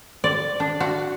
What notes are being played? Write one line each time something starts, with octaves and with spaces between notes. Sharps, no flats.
D5
D4
F#4